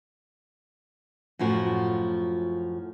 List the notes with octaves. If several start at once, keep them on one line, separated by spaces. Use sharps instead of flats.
F#2 A2 F3 F#4